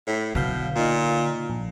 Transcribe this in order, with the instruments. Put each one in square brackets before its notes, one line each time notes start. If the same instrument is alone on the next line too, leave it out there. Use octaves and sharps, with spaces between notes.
[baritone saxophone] A2
[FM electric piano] B1 F5 G6 [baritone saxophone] B2 [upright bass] D3
[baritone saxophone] A#2 [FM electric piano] D#4 F4
[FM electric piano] A#1